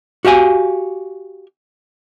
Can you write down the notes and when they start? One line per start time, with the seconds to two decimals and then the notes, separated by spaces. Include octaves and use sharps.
0.25 F#4 G4 F5 G#5